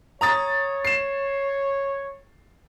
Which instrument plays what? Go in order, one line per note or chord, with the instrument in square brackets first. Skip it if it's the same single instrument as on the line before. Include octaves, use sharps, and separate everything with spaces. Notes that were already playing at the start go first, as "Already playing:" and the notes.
[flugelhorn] C#5 [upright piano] A#5 D#6 A6
[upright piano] C7 E7